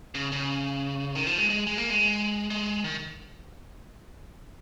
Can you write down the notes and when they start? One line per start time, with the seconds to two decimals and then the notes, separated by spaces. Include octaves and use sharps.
0.15 C#3
0.32 C#3
1.15 D#3
1.27 F3
1.38 G#3
1.50 G#3
1.67 G#3
1.78 A#3
1.90 G#3
2.50 G#3
2.84 D#3